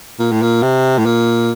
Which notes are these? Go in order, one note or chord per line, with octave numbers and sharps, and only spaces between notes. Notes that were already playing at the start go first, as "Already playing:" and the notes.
A#2
A2
A#2
C3
A2
A#2